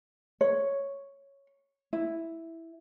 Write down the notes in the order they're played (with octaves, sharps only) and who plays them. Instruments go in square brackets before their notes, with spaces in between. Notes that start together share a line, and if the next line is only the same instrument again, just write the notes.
[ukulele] C#5
E4